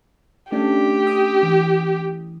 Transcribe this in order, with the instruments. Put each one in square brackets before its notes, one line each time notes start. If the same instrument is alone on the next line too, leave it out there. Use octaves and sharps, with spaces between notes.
[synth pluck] A3 C#4 D4 [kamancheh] G4
[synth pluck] D#6
E3